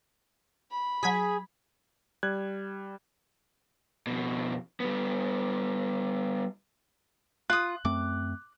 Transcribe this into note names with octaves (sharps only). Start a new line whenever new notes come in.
B5
F#3 G#4 G#6 B6
G3 F#6 G#6
F2 B2
G3 B3
F4 D#6 F#6
F#2 A3 C4 D6